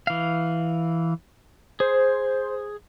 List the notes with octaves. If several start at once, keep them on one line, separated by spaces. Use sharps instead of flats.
E3 F5
G#4 C5